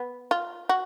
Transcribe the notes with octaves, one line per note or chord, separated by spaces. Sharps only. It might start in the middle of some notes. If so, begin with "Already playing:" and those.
Already playing: B3
F4
F#4